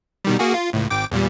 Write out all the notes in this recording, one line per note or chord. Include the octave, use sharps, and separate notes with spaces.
B2 D#3 G3
A#3 F#4 G#4
F4
C#2 A2
G#1 G5 D6
E2 A#2 G3